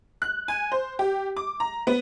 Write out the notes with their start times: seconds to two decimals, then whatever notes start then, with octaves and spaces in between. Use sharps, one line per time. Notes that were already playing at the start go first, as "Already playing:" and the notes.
0.22 F#6
0.48 G#5
0.72 C5
0.99 G4
1.37 D6
1.60 A#5
1.87 B3